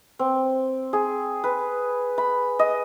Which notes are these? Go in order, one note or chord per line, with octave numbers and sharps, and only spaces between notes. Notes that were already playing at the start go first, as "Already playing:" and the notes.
C4
G#4
B4
B5
D#5